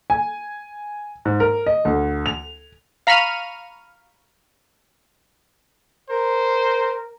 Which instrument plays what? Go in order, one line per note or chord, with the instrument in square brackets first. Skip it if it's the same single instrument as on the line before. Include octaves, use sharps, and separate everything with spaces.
[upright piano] G#5
G#2
A#4
D#5
D2
F7
[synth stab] F5 A#5 B5 C#6 F6 D#7
[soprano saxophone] A#4 [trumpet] C5